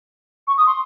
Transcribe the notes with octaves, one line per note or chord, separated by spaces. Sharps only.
C#6
D#6
C6